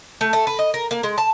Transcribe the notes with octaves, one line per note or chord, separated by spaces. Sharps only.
A3
A3
B4
D#5
A#4
A#3
G#3
A5